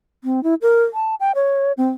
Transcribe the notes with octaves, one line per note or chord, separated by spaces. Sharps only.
C4
E4
A#4
A5
G5
C#5
C4